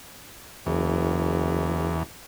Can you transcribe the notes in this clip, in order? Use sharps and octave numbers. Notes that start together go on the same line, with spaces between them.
F#1 E2